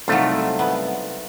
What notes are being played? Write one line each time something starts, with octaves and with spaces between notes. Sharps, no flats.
C2 F#3 A3 D#4 F4
B3